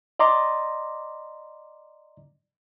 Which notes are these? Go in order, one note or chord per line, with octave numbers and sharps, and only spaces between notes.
D5 D#5 A#5 C6 D6